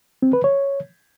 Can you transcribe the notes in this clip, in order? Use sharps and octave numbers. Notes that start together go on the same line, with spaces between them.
C4
B4
C#5